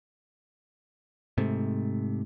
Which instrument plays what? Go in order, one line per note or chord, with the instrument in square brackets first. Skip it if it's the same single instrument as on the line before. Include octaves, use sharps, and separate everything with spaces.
[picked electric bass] G#2 C3 A3